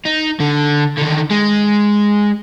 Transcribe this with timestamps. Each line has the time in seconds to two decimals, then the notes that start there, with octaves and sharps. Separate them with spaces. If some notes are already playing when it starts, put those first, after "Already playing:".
0.05 D#4
0.40 D3
0.98 D3 D#3
1.31 G#3